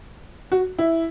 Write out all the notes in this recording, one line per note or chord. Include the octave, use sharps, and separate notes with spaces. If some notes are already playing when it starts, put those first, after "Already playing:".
F#4
E4